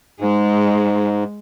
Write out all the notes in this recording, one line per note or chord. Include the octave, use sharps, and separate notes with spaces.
G#2 G#3